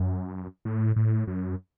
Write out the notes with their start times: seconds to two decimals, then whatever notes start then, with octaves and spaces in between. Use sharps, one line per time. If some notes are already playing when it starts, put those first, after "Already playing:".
Already playing: F#2
0.65 A2
0.96 A2
1.27 F#2